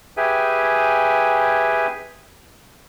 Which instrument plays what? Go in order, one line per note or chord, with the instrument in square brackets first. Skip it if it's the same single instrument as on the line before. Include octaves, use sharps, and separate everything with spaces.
[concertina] G4 G#4 B4 E5 G5 G#5